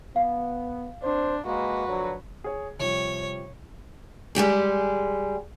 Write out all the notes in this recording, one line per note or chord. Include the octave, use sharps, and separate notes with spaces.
B3 F5
C4 D4 C5
G#3 A#3 F#4 B4
D3 F3 F#3
G#4 C#5
C3 F3 G3 C#5
G3 G#3 G4 G#4